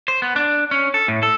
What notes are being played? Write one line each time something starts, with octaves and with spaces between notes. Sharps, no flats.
C5
B3
D4
C#4
A4
A2
A4